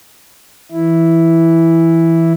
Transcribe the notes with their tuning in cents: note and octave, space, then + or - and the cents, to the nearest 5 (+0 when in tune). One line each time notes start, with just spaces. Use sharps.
E3 +0 E4 +0